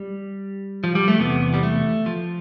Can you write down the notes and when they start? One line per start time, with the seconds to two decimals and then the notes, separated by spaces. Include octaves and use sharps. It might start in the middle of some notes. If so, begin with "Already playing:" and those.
Already playing: G3
0.84 F3
0.95 G3
1.08 A3
1.19 E2 C3 E3 B3
1.54 G3
1.63 A3
2.06 F3